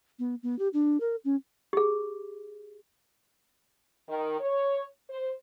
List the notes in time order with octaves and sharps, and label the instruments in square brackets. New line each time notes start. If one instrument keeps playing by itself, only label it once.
[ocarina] B3
B3
G4
D4
A#4
C#4
[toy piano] G4 G#4
[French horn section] D#3
C#5
C5